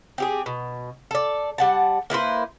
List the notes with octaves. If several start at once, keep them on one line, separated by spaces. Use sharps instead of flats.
C4 G4 G#4
B2
A4 D5
G3 F#5 A5
A#3 E4 B4 C5